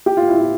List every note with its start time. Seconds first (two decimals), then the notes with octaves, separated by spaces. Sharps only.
0.06 G4
0.17 F4
0.28 E4
0.38 F4